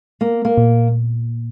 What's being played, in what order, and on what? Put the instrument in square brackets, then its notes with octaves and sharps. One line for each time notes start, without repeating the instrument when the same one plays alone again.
[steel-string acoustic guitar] A#3
A#3
[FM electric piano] A#2